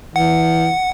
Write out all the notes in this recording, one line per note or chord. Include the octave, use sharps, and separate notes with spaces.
E3 F#5